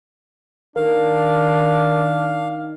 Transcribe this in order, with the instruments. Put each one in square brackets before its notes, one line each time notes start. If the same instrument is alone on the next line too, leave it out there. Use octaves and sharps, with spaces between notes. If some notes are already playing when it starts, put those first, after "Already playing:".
[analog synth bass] D#3 [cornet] D4 [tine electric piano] A#4 [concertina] F5